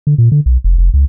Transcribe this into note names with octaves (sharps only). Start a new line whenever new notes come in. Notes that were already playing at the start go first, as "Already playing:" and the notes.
D3
A#2
D3
B1
F1
F1
C#2